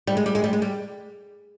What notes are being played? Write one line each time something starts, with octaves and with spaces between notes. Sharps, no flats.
G3
G#3
G3
G#3
G3
G#3
G3